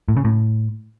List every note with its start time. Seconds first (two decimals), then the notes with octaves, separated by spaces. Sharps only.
0.08 A2
0.17 C#3
0.25 A2